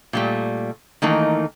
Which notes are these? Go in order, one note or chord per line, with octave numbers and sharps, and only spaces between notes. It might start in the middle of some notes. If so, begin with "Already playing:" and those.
A#2 G3 A3
D#3 E3 A3 A#3 D#4